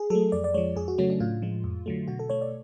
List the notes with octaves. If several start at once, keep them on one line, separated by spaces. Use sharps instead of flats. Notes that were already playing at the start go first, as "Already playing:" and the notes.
Already playing: G#4
F#3 A3 A4
F2 D5
D5
F3 G#3 C#5
F2 G#4
F#4
C#3 F#3 A3 C#4
D4
A2 F4
F3 G#3
F2
D3 F#3 A3
B2 F#4
A4
A3 C#5
D5